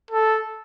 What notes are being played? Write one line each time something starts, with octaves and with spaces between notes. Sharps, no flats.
A4